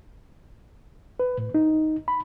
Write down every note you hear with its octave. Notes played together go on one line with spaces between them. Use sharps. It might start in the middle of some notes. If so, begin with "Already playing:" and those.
B4
A2
D#4
B5